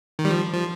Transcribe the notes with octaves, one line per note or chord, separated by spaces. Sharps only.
D#3
G3
F3
F3